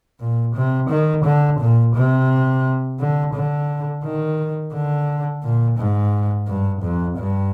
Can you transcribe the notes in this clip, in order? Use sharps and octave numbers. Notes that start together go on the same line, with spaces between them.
A#2
C3
D#3
D3
A#2
C3
D3
D3
D#3
D3
A#2
G#2
G2
F2
G2